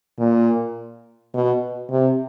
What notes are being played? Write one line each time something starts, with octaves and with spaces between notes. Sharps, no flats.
A#2
B2
C3